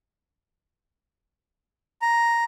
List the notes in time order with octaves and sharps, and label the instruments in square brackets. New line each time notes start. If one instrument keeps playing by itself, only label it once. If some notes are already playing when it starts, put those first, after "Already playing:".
[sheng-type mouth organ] A#5